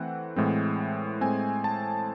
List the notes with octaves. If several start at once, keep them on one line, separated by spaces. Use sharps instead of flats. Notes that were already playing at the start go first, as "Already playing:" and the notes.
Already playing: E3 A3 C4 F#5
A2 E3 G#3 C4
A2 G#3 C4 G#5
A5